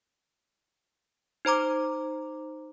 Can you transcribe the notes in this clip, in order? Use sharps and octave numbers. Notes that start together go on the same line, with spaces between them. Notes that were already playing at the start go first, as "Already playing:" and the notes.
D#4 C5 A#5 D6